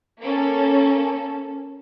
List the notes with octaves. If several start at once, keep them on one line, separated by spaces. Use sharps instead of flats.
A#3 C#4 A4